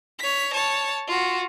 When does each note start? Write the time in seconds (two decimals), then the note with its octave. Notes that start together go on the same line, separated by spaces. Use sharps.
0.19 C#5 B6
0.53 C#5 A5
1.07 F4 F#4